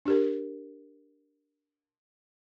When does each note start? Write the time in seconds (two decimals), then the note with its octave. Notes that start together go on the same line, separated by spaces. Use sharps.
0.06 D4 G4 A#4